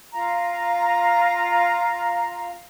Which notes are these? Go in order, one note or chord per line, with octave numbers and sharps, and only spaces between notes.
F4 F5 A#5